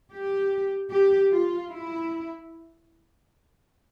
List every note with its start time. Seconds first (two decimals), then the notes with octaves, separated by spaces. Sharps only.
0.11 G4
0.90 G4
1.30 F4
1.69 E4